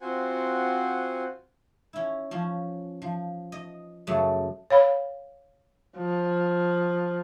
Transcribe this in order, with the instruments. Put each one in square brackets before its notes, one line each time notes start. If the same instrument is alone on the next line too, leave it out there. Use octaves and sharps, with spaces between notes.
[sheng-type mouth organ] C4 F4 F#4 C5 F#5 G#5
[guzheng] C#4 E4
F3 C#4
F3
D#5
F#2 C#3 A3
[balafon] C#5 F5 B5
[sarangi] F3